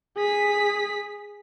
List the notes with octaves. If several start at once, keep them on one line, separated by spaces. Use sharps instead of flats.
G#4 B6